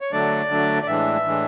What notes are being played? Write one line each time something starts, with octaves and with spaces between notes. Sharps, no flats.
C#5
D3 F#3 A3 D4 D5
D3 F#3 A3 D4
D5
A2 E3 G#3 D4 E5
A2 E3 G#3 D4